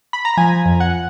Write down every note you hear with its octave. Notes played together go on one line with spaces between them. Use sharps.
B5
A#5
F3 G#5
F2
F#5